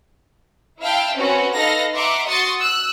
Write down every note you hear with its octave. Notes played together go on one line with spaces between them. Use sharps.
E4 E5 F5 G5 A5
C4 C#4 F#4 B4
D#4 A4 B4 F5 A#6
E5 F#5 A#5 C6 D6
F#4 C6 C#6 D#6 A6 C#7
E6 F#6